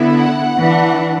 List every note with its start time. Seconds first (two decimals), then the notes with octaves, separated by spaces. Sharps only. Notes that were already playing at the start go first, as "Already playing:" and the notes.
Already playing: D3 B3 E4
0.19 F#5
0.58 E3 D4